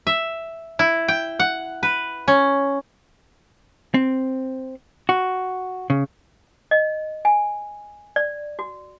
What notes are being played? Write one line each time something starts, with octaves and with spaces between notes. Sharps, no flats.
E5
E4
G5
F#5
B4
C#4
C4
F#4
C#3
D#5
G#5
D5
F#4